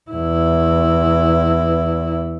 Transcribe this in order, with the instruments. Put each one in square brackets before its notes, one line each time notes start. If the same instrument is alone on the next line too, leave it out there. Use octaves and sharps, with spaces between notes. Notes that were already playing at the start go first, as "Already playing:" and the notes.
[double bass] E2 E4